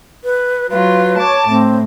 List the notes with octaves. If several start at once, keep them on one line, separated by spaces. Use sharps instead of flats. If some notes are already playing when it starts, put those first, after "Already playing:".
B4
F#3 F4 B4
C#5 A5 D6
A2 C4